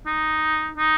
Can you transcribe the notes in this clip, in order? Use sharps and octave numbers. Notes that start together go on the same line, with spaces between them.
D#4
D#4